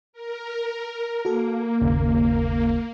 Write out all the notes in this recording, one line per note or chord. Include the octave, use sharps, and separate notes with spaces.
A#4
A#3 F#4 A4
G1 D#2 C#3